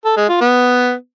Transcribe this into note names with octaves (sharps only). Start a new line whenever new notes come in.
A4
G#3
F4
B3